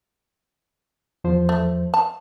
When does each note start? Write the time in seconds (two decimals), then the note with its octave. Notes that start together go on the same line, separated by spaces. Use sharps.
1.24 E2 F3 C5
1.49 A3
1.94 A5